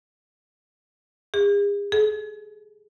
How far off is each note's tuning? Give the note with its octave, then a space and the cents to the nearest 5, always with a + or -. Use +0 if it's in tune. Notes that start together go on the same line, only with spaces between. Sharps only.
G#4 -40
G#4 +45